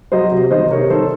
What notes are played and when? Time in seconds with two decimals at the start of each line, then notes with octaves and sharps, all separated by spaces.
0.12 F#3 C5 D#5
0.31 C3
0.51 D#3 C5 D#5
0.70 C3 A#4 C#5
0.90 D#3 A4 C5